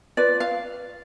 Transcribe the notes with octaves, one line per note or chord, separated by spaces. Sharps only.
F4 B4 D5
F5